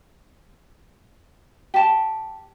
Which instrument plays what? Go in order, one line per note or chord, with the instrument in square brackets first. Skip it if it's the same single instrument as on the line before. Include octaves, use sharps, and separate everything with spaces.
[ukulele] G4 A5